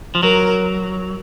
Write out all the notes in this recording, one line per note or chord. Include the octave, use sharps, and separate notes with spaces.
F3
F#3 A#4